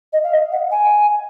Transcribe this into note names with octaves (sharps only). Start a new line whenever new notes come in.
D#5
F5
D#5
F#5
G#5